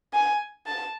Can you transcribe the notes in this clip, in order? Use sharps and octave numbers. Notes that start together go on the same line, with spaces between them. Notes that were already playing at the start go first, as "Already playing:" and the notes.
G#5
A5